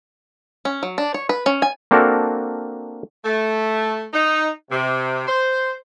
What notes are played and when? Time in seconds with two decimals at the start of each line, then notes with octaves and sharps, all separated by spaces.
0.65 C#4
0.83 F#3
0.98 D4
1.14 C#5
1.29 B4
1.46 C#4
1.62 G#5
1.91 A#3 C4 D4 F#4 A4 A#4
3.25 A3
4.13 D#4
4.71 C3
5.27 C5